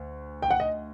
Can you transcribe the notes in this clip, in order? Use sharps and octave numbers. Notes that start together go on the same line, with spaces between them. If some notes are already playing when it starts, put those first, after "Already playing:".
Already playing: D2
G5
F#5
D#5